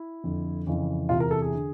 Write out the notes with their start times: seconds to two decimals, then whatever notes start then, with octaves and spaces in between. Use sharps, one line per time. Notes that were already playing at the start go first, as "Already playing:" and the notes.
Already playing: E4
0.24 F2 D3
0.67 F2 C#3 E3
1.09 E2 C3 E3 F4
1.20 A#4
1.31 A4
1.42 G#4
1.54 D3